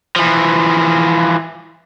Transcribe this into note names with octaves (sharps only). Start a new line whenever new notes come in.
E3 F3